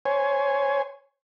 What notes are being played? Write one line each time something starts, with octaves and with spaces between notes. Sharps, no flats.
C5 C#5 G#5